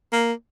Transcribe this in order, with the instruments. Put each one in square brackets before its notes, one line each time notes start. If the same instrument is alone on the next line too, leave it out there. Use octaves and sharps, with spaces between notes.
[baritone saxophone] A#3